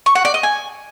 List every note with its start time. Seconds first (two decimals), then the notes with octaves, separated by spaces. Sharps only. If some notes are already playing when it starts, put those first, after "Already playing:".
0.06 C#6
0.15 F#5
0.25 D5
0.34 D#5
0.43 G#5